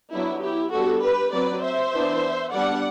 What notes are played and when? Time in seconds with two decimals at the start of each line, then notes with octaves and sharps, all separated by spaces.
0.13 F#3 B3 D4 E4
0.44 E4 G4
0.73 G3 B3 D4 F#4 A4
1.03 G4 B4
1.34 F#3 C4 B4 D5
1.64 C5 E5
1.94 E3 B3 D4
2.54 G3 B3 D4 D5 F#5